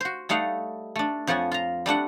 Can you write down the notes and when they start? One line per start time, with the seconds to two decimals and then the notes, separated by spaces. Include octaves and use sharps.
0.01 F#4 C5
0.29 G3 A3 D#4 F5 F#5
0.96 A3 D4
1.27 F2 F3 C#5 F#5 G#5
1.52 F4 A#5
1.86 G3 A3 D4 F#5